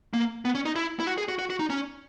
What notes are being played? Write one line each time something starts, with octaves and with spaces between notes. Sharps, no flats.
A#3
B3
C#4
D#4
E4
E4
F#4
G#4
F#4
F#4
F#4
D#4
C#4